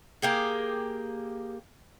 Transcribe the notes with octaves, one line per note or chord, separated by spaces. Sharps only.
A#3 G4 G#4